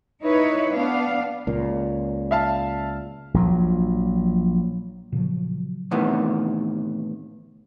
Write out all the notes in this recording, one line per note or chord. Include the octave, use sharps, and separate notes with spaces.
D#4 E4 B4 C#5
B3 D4 F5
C#2 A#2
E5 F5 A5
A#1 F3 F#3
A#2 C#3 F3 F#3
A2 C3 D#3 E3 B3